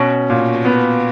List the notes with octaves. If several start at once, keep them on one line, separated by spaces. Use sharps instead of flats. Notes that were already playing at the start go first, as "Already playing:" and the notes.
Already playing: B2 C#4
A#2
B3